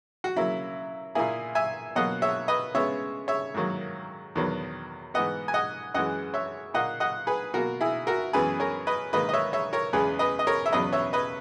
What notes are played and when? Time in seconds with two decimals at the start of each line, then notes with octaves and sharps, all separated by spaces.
0.24 F#4
0.36 C#3 F#3 A#3 E4
1.15 A#2 A#3 E4 G#4
1.55 E5 G#5
1.96 B2 F#3 A#3 D#5 F#5
2.22 C#5 E5
2.48 B4 D#5
2.75 C#3 G#3 B3 C#5 E5
3.28 C#5 E5
3.54 G#2 D#3 F#3 A#3
4.35 E2 D#3 F#3 B3
5.14 G#2 E3 B3 D#5 F#5
5.48 G#5
5.54 D#5 F#5
5.94 F#2 E3 G#3 D#5 F#5
6.34 C#5 E5
6.74 A#2 A#3 D#5 F#5
7.00 D#5 F#5
7.27 G#4 B4
7.54 B2 A#3 F#4 A#4
7.81 E4 G#4
8.07 F#4 A#4
8.33 F#2 E3 G#3 B3 G#4 B4
8.60 A#4 C#5
8.87 B4 D#5
9.13 G#2 D#3 A#3 B4 D#5
9.29 D#5
9.33 C#5 E5
9.53 C#5 E5
9.73 A#4 C#5
9.93 E2 C#3 G#3 B3 G#4 B4
10.19 B4 D#5
10.39 D#5
10.47 A#4 C#5
10.66 E5
10.73 E2 C#3 F#3 B3 B4 D#5
10.93 C#5 E5
11.13 B4 D#5